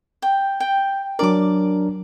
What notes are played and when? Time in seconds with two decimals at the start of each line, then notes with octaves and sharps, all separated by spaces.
0.22 G5
0.60 G5
1.19 F#3 D4 A#4 D5 D6